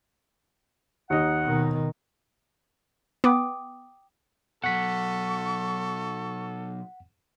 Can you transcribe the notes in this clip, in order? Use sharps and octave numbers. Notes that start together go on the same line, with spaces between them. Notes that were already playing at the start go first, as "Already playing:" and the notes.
D#2 D#4 F#5
B2 D#3
B3 G5 D6 D#6
B2 F#3 A4 F#5 C#6 B6